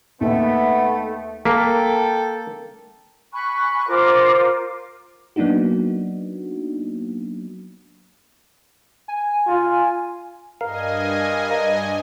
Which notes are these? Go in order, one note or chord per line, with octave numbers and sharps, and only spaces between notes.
D#2 A3 B3 E5
A#3 A4 G5 B6
G#5 B5 C#6 F#6
F4 A#4 C5 D6
F#3 A#3 B3 D4 D#4 F#4
G#5
F4
G2 A#4 D#5 F5 G#5